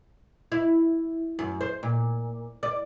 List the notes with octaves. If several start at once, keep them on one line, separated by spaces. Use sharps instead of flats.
E4
F#2
C5
A#2
D5